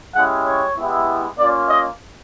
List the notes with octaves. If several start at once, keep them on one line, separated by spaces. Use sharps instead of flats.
G#3 C#4 E4 G4 F#5
C#5
G#3 B3 E4 G4
A#3 C#4 F4 D5
D#5